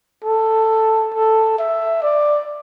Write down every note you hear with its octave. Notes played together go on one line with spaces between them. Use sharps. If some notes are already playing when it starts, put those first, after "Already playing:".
A4
A4
E5
D5